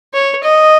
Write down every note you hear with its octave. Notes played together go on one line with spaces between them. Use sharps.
C#5
D#5